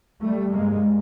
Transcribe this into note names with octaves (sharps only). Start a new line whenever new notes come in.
G3 A3
G2 G#3 A#3